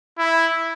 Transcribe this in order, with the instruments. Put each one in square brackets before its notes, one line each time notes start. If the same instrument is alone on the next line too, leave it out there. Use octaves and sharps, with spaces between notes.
[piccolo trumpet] E4